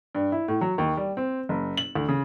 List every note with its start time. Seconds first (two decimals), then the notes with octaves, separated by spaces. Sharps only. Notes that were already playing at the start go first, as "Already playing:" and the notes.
0.15 G2
0.32 E4
0.48 A2
0.61 F#3
0.78 D#2
0.97 G3
1.17 C4
1.49 F#1
1.78 F#7
1.95 D2
2.09 C#3